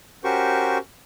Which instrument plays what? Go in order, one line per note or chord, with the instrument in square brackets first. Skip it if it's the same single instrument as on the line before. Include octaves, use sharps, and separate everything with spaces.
[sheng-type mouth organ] C#4 F#4 G4 A#4 C5 C#6